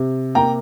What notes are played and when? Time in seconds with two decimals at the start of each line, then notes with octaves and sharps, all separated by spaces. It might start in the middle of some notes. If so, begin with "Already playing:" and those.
Already playing: C3
0.35 A#3 G5 A#5